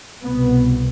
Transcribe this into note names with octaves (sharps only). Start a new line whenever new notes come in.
C2 B2 B3